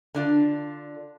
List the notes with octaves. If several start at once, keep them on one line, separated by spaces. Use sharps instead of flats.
D3 D4 F4